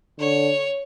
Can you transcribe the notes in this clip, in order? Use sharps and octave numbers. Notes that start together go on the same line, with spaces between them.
D3 C#5